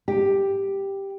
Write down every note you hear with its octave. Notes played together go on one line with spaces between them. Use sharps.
G4